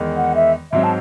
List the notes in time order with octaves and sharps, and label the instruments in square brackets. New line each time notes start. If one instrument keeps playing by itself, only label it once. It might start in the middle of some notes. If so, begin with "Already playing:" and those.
Already playing: [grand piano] E2 D#3 G#3
[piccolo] F#5
E5
[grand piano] G#2 F#3 C4 [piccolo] E5
[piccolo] A5